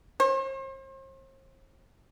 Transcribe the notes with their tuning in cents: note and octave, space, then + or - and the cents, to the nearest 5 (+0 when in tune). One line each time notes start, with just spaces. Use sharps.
C5 +40